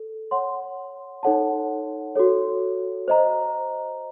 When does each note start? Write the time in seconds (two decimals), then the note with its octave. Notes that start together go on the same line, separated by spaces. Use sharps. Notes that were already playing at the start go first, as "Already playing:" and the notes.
Already playing: A4
0.31 C#5 F#5 C6
1.23 D#4 A4 C#5 F#5 A5
2.15 F#4 A4 C#5
3.08 C5 D#5 A#5